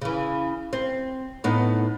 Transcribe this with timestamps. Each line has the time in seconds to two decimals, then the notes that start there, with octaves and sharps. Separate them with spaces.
0.01 C#3 E3
0.73 C4
1.44 A2 B3 D#4